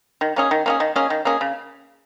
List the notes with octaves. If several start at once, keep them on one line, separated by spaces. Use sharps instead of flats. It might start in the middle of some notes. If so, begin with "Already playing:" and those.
D#3
A#3 C#4 G#4
D#3
A#3 C#4 G#4
D#3
A#3 C#4 G#4
D#3
A#3 C#4 G#4
C#3